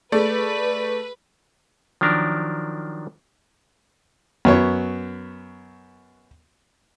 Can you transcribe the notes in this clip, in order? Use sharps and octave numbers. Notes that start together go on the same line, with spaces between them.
A3 G#4 B4 D5
D#3 F3 F#3 D4 A#4
F#2 B3 C#5